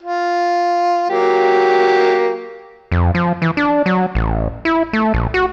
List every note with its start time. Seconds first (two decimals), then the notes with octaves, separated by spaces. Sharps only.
0.02 F4
1.10 F#3 A#3 G4
2.92 F2
3.15 F3
3.42 E3
3.57 D4
3.86 F#3
4.15 A1
4.65 E4
4.93 A3
5.14 A#1
5.34 F#4